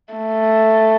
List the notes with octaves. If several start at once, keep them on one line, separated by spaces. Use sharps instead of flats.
A3